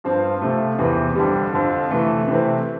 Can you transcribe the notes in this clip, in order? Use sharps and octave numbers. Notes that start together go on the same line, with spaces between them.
G2 F3 C4
C3 F3 A3
E2 C3 E3
F2 D3 G3
F2 D3 F3
C3 E3 A3
C3 E3 A3 C4